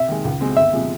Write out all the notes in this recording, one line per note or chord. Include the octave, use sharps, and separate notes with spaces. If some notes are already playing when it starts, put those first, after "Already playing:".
Already playing: C3 E5
D#3 G#3
C#2
B2 G#3 C4
G1 E5
C3 F3 G#3